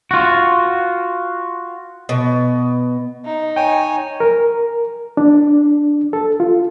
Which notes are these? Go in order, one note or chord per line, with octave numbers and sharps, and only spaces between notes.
F4 F#4
B2
D#4
C#5 G5 G#5
A#4
D4
A4
F4